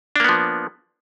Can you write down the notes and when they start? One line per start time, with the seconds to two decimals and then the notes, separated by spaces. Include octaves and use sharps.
0.16 D4
0.20 A#3
0.24 B3
0.29 F3